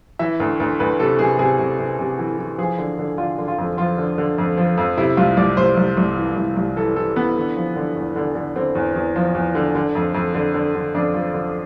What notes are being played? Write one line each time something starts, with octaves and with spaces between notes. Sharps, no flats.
E3 E5
D2
D2
D2 B4
C3 A4
C3 G#4
C3 G#4
C3
C3
C3
E3
E3
F3 G#4
D3
D3
D3 F4
D3
F4
F2
F3 F4
D3
D3
F2
F3
F2
C3 E4
C2 F4
C2 D5
C2 C5
C2
C2
E3
C2
C2
E3 A4
E3 A4
E3 B3
D3
F3
D3
E2
D3
D3
D3 C4
E2
E2
F3
E2
D3
D3
F2
F2
D3
D3
D3
F2 D4
F3
D3